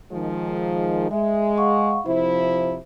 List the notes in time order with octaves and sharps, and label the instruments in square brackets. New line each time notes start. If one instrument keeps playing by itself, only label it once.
[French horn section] D#3 F3 G#3
[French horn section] G#3 [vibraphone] E5
[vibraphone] F5 F#5 C#6
[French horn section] C3 F3 E4 [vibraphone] C5